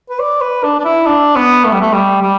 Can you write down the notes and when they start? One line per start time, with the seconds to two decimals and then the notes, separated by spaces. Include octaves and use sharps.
0.10 B4
0.20 D5
0.41 B4
0.63 D4
0.79 D4
0.85 E4
1.06 D4
1.36 B3
1.64 A3
1.72 G3
1.81 A3
1.93 G3
2.22 G3